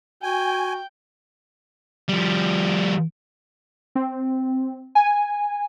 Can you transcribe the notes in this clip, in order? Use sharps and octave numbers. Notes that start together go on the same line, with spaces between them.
F#4 G5 G#5
F3 G3
C4
G#5